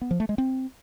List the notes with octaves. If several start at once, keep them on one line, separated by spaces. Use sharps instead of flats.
B3
F3
A3
G#3
C4